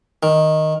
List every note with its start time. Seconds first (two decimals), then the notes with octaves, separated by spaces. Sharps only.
0.23 D#3